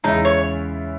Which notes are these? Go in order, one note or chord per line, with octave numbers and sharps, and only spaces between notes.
E2 C#3 G#3 C#4 D#4 E4
C#5